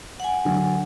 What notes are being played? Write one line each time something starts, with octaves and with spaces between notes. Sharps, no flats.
F#5 G#5
D3 F#3